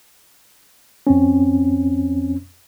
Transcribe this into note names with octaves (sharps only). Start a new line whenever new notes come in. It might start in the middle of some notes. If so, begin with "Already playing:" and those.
F2 C4 C#4